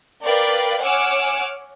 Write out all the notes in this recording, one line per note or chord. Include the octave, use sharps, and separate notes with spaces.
A#4 B4 D5 F5 G5
C#5 F#5 G#5 D6 E6 F6